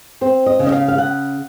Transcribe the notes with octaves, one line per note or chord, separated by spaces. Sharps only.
C4 C5
D#5
C#3
D#5
F5
F5
C#3 F#5